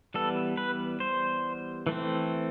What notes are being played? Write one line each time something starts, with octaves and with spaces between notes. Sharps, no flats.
E3 G3 B3 A4
B4
C5
E3 A3 C4